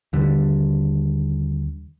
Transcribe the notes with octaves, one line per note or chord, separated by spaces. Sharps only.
D#2 D3 G3